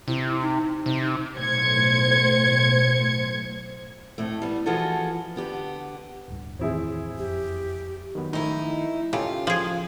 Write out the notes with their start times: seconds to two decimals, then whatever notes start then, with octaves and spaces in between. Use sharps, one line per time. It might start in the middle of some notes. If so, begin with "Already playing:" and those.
0.08 C3 E4
0.42 D#4
0.86 C3
1.37 B1 A2 C5 G#6 C#7
4.18 F2 A2 A3
4.42 G3 B3
4.66 E3 F3 F4 F#4 G#4 A4
5.36 D3 B3 G4
6.28 D1 G2
6.59 E2 A2 D#3 C4 E4 G#4
7.18 F#1 F2 G4
8.15 D#3 F#3 B3
8.33 D#3 F3 A3 D#4 E4
9.13 C#3 F4 G4 A4
9.47 F3 G#4